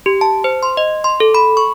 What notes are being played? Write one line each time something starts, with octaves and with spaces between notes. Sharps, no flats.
G4
A5
C5
C6
D#5
C6
A4
B5
C#6